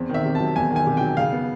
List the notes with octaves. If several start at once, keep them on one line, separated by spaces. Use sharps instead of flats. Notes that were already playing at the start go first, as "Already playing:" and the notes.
Already playing: E2 C4
D#3 E5
C3
A5
F#3
E2 G#5
D#3
G#5
C3
G5
F#3
C#3 F5
B3